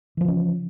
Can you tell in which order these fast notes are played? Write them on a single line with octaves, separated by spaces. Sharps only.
E3 F3 C#3 C#4